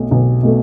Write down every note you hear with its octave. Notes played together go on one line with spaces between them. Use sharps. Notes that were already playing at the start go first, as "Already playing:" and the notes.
Already playing: B1 B2 A3
B1
B2 A3